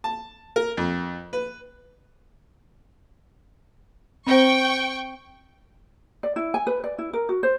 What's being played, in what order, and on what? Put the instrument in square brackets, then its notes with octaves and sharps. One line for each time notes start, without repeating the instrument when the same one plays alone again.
[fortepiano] A5
A#4
F2
B4
[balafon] C4 C5 [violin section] G5 C#6
[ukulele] D5
E4
G#5
B4
D5
E4
A#4
F#4
C5